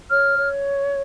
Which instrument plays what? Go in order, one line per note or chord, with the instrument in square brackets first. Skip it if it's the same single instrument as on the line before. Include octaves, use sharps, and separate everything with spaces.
[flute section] C#5 F6
C#5